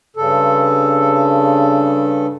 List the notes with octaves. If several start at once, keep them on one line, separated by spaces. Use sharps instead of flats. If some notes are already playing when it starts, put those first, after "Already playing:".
G2 C#3 A4